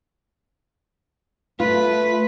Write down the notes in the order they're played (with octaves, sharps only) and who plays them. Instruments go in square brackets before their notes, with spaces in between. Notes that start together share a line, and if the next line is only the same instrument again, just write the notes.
[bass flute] A3 [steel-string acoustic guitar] F4 [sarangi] B4